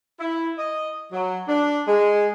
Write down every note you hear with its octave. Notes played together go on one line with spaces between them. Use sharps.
E4
D#5
F#3
D4
G#3